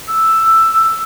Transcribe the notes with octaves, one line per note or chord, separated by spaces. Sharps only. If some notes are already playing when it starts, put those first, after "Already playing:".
E6